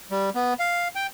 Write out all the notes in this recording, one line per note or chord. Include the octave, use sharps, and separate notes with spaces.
G3
B3
F5
G5